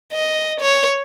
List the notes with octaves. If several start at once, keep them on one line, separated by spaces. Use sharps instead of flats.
D#5
C#5